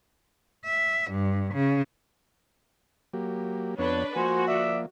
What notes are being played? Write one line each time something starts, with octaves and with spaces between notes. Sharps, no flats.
E5
G2
C#3
F#3 A#3 G4
F2 B3 D4 B4 C#5
F3 A#3 F#4 C5 G#5
D5 E5